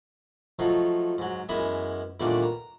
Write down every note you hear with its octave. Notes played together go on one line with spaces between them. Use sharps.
F3 F#3 A3 D#4 F4
G#2 F#3
F#2 E3 G#3 B3 E5 D#6
E2 A#2 D#3 G3 A3 D4
A#5